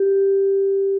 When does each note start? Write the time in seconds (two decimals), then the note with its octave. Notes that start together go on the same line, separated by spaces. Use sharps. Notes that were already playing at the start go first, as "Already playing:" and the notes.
Already playing: G4